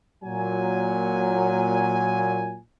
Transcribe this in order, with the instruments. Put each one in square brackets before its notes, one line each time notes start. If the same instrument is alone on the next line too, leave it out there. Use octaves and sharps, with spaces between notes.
[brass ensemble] A#2 F#3 G#5